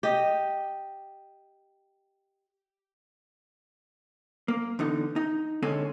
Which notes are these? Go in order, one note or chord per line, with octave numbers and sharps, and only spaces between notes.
G4 D#5
A#3
E2 D3 D#4
D#4
D3 G#3 C4 C#4 A4 C#5